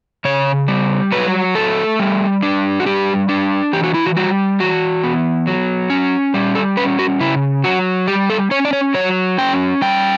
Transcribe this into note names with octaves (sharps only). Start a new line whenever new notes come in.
C#3 C#5
G3
F#3 B4
A3 A4
G3
D4
F#4
G3 G4
D4
E3 G4
F#4
E4
F#4
G3 F#4
E3 F#4
B3
F#3
C#4
G3
A4
C#4 B4
F#4
C#3 E4
F#3 F#4
G3 G4
A4
C#4 C#5
D5
C#5
F#3 C#5
C#4 G5
G3 G5